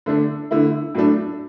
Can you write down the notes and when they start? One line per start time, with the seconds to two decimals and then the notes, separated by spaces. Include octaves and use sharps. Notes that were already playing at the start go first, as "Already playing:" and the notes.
0.06 D3 A3 D4
0.51 D3 A3 E4
0.95 A2 F#3 A3 D4